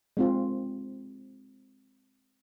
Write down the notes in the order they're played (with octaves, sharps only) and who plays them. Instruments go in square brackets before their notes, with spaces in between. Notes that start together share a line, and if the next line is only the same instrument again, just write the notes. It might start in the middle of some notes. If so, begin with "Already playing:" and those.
[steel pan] G#3 C4 F4